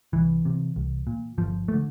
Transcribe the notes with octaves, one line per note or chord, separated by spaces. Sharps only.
C2 E3
C3
C2
A#2
G1 F3
A3
D3